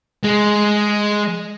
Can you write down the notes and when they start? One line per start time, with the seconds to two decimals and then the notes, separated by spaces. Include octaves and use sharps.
0.24 G#3